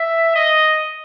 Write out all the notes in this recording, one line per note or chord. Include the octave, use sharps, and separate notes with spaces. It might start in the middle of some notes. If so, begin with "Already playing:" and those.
Already playing: E5
D#5